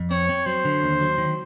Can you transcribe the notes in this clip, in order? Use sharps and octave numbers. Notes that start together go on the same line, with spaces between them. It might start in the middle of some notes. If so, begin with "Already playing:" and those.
Already playing: F2
C4 C#5
C4
F#3 C5
D3
D#2
F#3
D#3